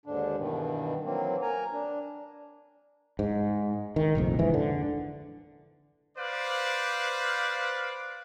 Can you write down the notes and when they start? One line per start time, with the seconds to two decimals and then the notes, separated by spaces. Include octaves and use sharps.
0.06 D#2 G#2 D3 D4
0.37 G2 B2 D#3 E3
1.04 E3 F#3 A#3 C4
1.42 A#4 G#5 A#5
1.72 D4
3.19 G#2
3.96 D#3
4.15 F1 A#1 F2
4.39 G#2 E3
4.54 D3
6.18 B4 C5 D5 F5